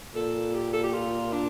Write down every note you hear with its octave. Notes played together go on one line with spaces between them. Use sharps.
A#2 A4
G4
A4
G4
F4
D4